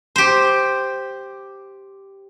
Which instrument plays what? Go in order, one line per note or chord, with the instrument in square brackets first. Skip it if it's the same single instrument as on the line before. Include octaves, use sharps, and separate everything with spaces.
[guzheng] G4 C5